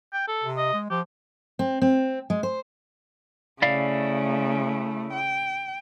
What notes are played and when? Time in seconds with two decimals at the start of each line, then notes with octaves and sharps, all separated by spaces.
0.13 G5
0.28 A4
0.44 C3
0.57 D#5
0.73 G#3
0.90 F3 G4
1.59 C4
1.82 C4
2.30 G#3
2.43 C5
3.62 C#3 A3 E4 D5 F5
5.14 G5